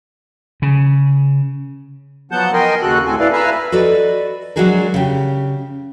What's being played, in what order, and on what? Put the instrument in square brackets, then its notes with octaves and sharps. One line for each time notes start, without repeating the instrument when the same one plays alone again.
[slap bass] C#3
[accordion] F3 F#3 B3 F#5 A5 G6
A#4 D#5 G5 G#5 C6
D#2 C#3 F#4 A4 F#6
D2 A2 C4 A4 G#5
E4 A4 B4 D5 F5
B4 E5 F5 G#5 A#5 B5
[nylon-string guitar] F#4 A4 B4 D5 D#5
F#3 G#3 D4 F#4 G#4 A#4
C#3 G4